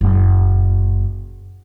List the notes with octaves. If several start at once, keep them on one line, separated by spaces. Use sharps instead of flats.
F#1 A#2